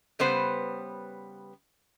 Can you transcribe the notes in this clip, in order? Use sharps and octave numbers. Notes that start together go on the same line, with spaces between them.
C#3 G3 B3 B4 C5